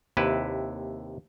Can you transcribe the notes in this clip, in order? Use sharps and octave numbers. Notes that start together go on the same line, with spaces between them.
D#2 C3 E4 B4